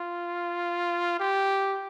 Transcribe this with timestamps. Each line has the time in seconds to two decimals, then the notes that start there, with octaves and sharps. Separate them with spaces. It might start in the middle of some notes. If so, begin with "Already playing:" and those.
Already playing: F4
1.20 G4